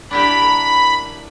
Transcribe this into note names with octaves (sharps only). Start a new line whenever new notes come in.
D4 E4 G4 B5
A#4